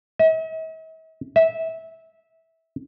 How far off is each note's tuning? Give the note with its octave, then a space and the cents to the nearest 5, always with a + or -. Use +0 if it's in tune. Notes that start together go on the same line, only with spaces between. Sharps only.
E5 -45
E5 -15